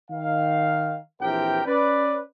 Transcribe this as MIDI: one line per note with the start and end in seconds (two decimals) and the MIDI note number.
0.11 0.97 51
0.11 0.97 77
1.20 1.61 34
1.20 1.61 52
1.20 1.61 60
1.20 1.61 67
1.20 1.61 70
1.20 1.61 79
1.65 2.20 61
1.65 2.20 71
1.65 2.20 74